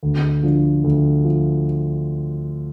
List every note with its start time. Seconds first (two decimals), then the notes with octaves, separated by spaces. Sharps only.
0.03 D2
0.43 D3 F3
0.84 D2
1.24 F3